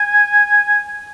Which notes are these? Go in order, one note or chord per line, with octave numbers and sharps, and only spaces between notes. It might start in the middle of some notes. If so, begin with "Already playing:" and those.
Already playing: G#5